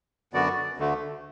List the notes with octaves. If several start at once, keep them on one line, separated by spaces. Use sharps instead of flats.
F#2 D3 B3 F#4 D5
D2 D3 A3